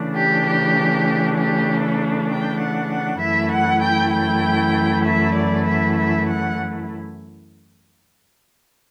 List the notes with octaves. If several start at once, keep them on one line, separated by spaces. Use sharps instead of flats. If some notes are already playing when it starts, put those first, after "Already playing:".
Already playing: C#3 E3 A3 D4
G4
G4
G4
A4
G5
F#5
F#5
F#2 E3 A3 E4 E5
F#5
G5
G5
E5
D5
E5
E5
F#5